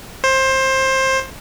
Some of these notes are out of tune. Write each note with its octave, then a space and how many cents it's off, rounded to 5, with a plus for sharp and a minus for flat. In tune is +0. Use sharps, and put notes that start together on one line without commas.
C5 +20